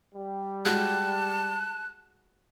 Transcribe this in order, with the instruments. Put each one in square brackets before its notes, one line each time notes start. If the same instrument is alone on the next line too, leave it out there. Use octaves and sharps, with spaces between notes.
[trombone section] G3
[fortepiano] G#3 F#4 [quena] A5 [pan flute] F#6